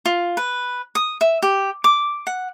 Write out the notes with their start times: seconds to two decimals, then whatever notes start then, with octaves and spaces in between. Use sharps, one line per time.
0.06 F4
0.37 B4
0.95 D#6
1.21 E5
1.43 G4
1.84 D6
2.27 F#5